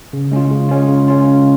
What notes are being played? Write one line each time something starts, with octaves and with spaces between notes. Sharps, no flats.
C#3
G#3 C#4 F4
C#3
G#3 C#4 F4
C#3
G#3 C#4 F4
C#3